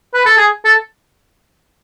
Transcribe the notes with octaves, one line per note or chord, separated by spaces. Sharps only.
B4
A4
G#4
A4